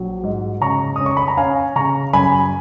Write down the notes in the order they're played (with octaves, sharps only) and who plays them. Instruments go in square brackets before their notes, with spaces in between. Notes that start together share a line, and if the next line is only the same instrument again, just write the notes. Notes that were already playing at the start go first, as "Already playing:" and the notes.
Already playing: [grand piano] A#1 F#3
G#2
C#3 A#5 C#6
C#4 D#6
C#6
B5
A#5
C#4 F5 G#5
C#3 A#5 C#6
F#2 G#5 B5